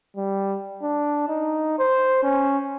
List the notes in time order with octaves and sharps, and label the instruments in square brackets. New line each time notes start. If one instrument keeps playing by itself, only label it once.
[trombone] G3
D4
D#4
C5
C#4